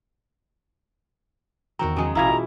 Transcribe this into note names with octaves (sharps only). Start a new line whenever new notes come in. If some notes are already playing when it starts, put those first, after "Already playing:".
E2 D#3 C4 F#4 A#4 A#5
C#3 F#3 G#3
A1 B2 E3 E4 F5 A#5 G#6
F4 G#4